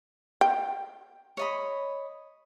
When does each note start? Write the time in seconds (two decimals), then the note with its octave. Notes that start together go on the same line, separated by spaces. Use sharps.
0.41 G5
1.37 C#5 D#5 B5